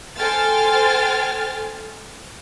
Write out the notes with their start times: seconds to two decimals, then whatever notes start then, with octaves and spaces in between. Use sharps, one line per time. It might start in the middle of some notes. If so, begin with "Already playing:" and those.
0.17 A4 C5 G5 G#5 F6 A6